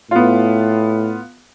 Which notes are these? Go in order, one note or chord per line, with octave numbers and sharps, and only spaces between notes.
A2 B3 F4